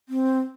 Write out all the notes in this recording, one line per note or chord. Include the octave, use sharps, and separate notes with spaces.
C4